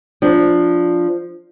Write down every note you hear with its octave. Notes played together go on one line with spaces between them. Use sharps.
F3 D4